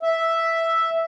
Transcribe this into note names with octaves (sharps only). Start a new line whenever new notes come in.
E5